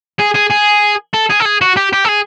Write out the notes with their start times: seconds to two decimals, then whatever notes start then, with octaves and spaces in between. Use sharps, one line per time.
0.19 G#4
0.35 G#4
0.51 G#4
1.14 A4
1.30 G#4
1.40 A4
1.45 G#4
1.62 F#4
1.77 G4
1.93 G4
2.05 A4
2.09 G#4